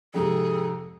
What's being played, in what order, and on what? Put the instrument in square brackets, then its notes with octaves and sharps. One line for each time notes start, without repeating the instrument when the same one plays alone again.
[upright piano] F2 G#2 C3 [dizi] G#4 [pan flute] A4